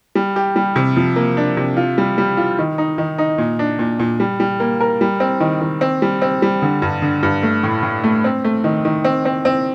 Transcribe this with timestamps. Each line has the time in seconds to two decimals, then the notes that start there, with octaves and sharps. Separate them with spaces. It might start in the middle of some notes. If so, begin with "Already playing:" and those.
0.15 G3
0.36 G4
0.56 G3
0.76 C3
0.97 F3
1.16 A#3
1.37 D4
1.57 C3
1.77 F4
1.98 G3
2.18 G3
2.37 F4
2.59 D#3
2.78 D#4
2.98 D#3
3.18 D#4
3.38 A#2
3.59 D4
3.79 A#2
3.99 A#2
4.20 G3
4.40 G3
4.60 A#3
4.80 A#4
5.01 G3
5.20 C4
5.40 D#3
5.61 D#3
5.81 C4
6.02 G3
6.22 C4
6.42 G3
6.62 D3
6.82 G2
7.02 D3
7.23 G2
7.43 A3
7.63 A2
7.83 A2
8.04 A3
8.24 C4
8.45 A3
8.64 D#3
8.85 D#3
9.04 C4
9.25 C4
9.45 C4